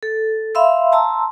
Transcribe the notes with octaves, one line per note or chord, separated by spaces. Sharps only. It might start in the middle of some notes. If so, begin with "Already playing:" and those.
A4
E5 F5 B5 C6 E6
A5 A#5 C6 E6